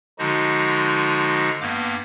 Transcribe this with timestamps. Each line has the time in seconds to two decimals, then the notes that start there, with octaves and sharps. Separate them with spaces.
0.19 D3 F3 G#3 D#4 F#4
1.61 G2 A#3 B3 D6